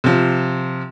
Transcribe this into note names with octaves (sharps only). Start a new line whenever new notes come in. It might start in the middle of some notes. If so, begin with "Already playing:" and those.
C3 F3